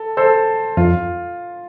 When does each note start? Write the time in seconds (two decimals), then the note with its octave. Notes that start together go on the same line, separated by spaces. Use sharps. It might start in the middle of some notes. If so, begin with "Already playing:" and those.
Already playing: A4
0.17 A4 C5
0.77 F2 F4